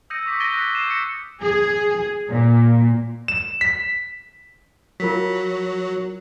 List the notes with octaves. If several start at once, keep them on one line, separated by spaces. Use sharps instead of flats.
D#6 E6 G6 A#6 C#7 D#7
C#6 D6 B6
G6 A6 A#6 D7 D#7 G7
F#6 A#6 B6 C#7
G6 C7 D#7 E7
A#6 C#7
G#4
A#2
E7
B6
F#3 F4 A#4 B6